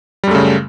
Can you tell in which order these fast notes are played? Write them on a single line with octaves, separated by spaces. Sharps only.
G3 F#2 A3 C#3